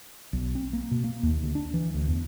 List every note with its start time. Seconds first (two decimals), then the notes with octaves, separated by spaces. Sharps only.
0.33 B1
0.55 C4
0.73 A#3
0.91 B2
1.04 A#3
1.23 D#2
1.43 D2
1.55 D4
1.74 E3
1.94 D2
2.08 E2